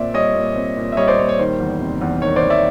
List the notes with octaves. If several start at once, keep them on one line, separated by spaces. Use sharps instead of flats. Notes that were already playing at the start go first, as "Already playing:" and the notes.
Already playing: A#2 C4 D5 E5
G3 C#5 D#5
A#2
C4
A#2
E5
G3 C#5 D#5
C5 D5
A#2 C#5
C#5
D#3 C5
E2
C3
E2
D#3 C#5
C5 D5
E2
D5 E5